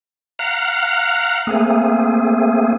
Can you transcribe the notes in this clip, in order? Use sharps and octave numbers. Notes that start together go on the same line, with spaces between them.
F5 F#5 A#5 F6 F#6
A3 A#3 C4 G#4